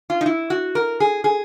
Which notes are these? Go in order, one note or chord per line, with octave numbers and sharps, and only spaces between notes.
F4
D#4
E4
F#4
A#4
G#4
G#4